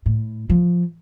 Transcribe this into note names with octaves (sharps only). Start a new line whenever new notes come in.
A2
F3